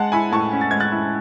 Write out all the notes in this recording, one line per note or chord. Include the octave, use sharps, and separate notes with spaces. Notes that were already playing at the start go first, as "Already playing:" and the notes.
Already playing: G#3 F#5 A5
E4 G#5 B5
A2 A5 C#6
C#4
A6
G#3 G#6
F#6 A6
E4